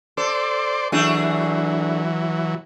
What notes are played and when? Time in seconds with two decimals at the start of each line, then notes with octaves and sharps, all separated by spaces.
0.17 A4 C5 D5
0.92 E3 F#3 A3 D4 G#4